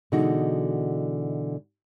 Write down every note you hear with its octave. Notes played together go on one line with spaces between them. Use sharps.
B2 D3 E3 G#3 D#4 F#4